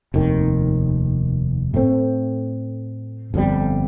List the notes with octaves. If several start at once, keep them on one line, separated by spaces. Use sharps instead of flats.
F1 D#2 D#3
A2 A3 C4
G1 F2 C3 G3